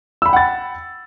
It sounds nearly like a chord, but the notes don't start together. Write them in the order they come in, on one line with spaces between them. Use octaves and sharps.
E6 B5 G5 F#5 A6